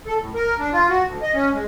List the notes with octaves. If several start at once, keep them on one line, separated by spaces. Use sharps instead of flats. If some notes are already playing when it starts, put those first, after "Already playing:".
A4
A2
A#4
D4
F4
F#4
D2
D#5
C#4
G#3